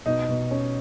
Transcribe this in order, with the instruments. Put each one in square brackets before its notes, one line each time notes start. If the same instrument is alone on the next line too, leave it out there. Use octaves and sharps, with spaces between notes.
[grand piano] B2 [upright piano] D#4
[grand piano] B2
C#4